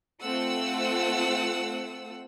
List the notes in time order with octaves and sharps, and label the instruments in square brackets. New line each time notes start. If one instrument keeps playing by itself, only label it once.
[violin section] A3 C4 F4 F#5 E6